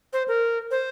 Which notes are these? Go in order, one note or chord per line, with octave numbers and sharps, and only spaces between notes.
C5
A#4
C5